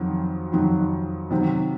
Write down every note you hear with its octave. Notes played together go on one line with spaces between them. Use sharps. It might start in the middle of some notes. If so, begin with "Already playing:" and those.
Already playing: F2 D#3 F#3
F2 D#3 F#3
C3 D#3 F#3 C4